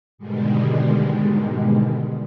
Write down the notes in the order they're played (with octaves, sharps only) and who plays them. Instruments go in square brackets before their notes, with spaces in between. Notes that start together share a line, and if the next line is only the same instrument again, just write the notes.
[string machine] G#2 B2 D3 D#3 G3 G#3